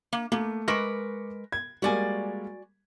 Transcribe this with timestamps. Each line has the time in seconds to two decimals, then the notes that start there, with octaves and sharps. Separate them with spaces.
0.13 A#3
0.32 A3 A#3
0.68 G#3 A#4 B4 C#6 D6 A#6
1.52 G#6
1.82 G3 G#3 A#3 F#4 D5 G#5